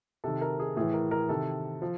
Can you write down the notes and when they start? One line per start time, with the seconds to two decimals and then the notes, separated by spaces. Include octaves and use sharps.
0.24 C3 D#3 A4
0.41 A#4
0.60 G#4
0.76 A2 E3 G#4
0.94 A#4
1.11 A#4
1.29 C3 D#3 A4
1.82 F3